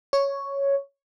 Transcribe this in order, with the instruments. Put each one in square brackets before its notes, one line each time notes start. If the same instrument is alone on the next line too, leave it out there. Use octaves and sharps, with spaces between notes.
[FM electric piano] C#5